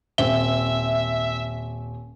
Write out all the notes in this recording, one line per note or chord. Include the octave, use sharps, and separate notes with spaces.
D#1 C4 E5 G7